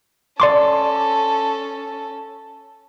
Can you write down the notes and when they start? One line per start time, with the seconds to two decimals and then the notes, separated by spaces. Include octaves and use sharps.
0.40 C#4 A4 D5 C6 D6